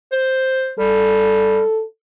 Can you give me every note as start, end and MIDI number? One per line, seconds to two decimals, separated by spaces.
0.12 0.72 72
0.79 1.61 55
0.79 1.84 69